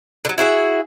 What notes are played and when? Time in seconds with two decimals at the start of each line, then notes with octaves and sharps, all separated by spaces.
0.25 D3 F#3
0.38 E4 F#4 G#4 E5